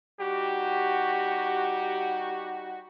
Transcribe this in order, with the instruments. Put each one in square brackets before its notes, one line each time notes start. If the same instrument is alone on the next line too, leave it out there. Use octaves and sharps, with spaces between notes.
[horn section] G3 D#4 F#4 [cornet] G4